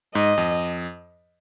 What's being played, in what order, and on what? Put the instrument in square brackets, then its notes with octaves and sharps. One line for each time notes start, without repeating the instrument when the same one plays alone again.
[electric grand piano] G#2 [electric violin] D#5
[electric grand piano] F2